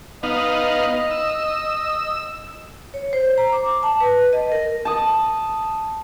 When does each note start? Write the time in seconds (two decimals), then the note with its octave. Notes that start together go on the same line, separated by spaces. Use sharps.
0.23 B3 D#4 D#5 F5
1.11 E6
2.94 C#5
3.13 C5
3.38 A#5
3.52 D6
3.83 A5
4.00 B4
4.33 D#5
4.52 A#4
4.85 A5 D#6